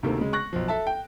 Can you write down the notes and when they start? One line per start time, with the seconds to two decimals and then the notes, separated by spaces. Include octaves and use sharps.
0.03 D2 C3 D#3 A3 A#3
0.18 C#3 G#3
0.33 C#6 F#6 A#6
0.53 B1 F3
0.68 A4 E5 A5
0.87 G5